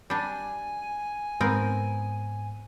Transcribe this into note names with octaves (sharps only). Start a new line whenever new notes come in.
G3 D4 G#5
G#2 B3 C4 A#4